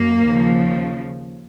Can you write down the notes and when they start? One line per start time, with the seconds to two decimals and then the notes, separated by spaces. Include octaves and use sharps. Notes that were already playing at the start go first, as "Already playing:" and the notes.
Already playing: F#2 A#3
0.25 D#2 C#3 F3